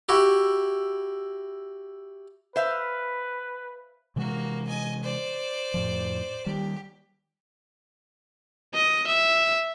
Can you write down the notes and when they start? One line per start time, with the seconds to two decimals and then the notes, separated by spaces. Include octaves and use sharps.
0.09 E4 F#4 G4
2.56 B4 C5 E5 F5
4.16 C3 E3 G#3 A#3 F#4
4.67 D#5 G#5
5.03 C5 D5
5.74 F2 A2 F3
6.46 D#3 G3 G4
8.74 D#5
9.08 E5